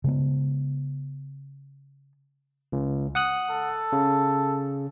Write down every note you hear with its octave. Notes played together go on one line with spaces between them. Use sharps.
C#3 G#3 B3
C#2
F#5 D#6 F#6
A4
C#3